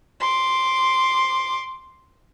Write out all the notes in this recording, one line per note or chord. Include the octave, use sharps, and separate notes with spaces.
C6 D6